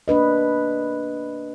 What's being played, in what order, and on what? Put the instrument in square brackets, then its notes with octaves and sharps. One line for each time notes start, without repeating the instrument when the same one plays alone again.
[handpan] A#3 D4 B4 D#5